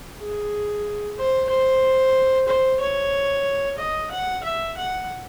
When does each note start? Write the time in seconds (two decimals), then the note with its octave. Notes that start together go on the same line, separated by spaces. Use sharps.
0.19 G#4
1.18 C5
1.50 C5
2.48 C5
2.80 C#5
3.78 D#5
4.11 F#5
4.44 E5
4.77 F#5